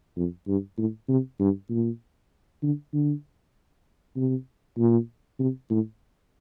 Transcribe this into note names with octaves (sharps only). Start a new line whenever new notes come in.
F2
G2
A2
C3
G2
A#2
D3
D3
C3
A#2
C3
A2